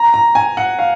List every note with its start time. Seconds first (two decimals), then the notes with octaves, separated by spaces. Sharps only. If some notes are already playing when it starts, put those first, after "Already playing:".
Already playing: A#5
0.14 A#5
0.35 G#5
0.57 F#5
0.79 F5